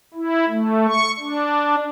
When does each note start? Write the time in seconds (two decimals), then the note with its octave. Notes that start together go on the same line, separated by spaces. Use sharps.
0.14 E4
0.49 A3
0.87 C#6
1.19 D4